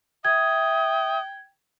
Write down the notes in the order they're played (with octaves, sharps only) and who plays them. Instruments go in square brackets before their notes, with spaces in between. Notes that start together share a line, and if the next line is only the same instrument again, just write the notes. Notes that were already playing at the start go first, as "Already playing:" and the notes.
[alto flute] E5 [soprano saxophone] G5 [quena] D#6 [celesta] G#6